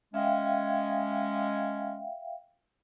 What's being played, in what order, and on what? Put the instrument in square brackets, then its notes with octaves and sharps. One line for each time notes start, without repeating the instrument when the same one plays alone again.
[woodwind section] G#3 C#4 [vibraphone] E5 F5 G5